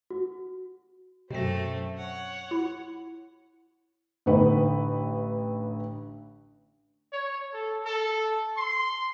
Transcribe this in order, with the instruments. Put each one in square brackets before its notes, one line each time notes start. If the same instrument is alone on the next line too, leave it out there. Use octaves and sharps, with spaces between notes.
[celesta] F#4
[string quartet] F#2 A3 C4 [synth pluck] B2 A#6
[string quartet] C#5 F#5
[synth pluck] E4
[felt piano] A1 D3 D#4 B4
[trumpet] C#5
A4
A4
C6